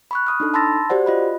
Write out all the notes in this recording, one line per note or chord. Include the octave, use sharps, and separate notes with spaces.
B5 C#6 F#6
B5 D#6 F6
D4 D#4 A4
A5 B5 C6 E6 A6 A#6
F#4 G4 C5 D5 F#5
F4 D#5 B5